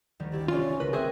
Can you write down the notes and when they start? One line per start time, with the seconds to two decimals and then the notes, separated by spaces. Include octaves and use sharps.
0.20 D2 D#3 G3
0.32 G#1 E4 G4 D5
0.48 C2 C#4 F4 D5 G#5 C#6
0.80 C#2 A#4 B4
0.93 C4 G#4 A#4 C5 E5 G5 C#6 F#6